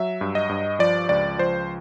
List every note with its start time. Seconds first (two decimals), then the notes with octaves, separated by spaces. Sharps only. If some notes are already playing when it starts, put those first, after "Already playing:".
Already playing: F#3 E5
0.21 G2
0.35 D#5
0.49 G2
0.79 F3 D5
1.09 C#2 D5
1.38 F3 C5